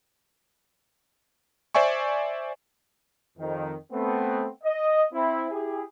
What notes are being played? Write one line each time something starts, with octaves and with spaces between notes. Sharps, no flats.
C5 D5 E5 G#5 C#6
F2 D#3
A3 B3 C4
D#5
C4 E4
E4 G4 G#4